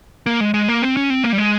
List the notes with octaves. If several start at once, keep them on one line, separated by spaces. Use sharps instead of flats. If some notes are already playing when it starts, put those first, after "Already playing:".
A#3
G#3
G#3
A#3
C4
C#4
C4
A#3
G3
G#3